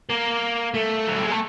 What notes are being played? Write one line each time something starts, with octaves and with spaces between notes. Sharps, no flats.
A#3
A3
F#3
G3
G#3
A3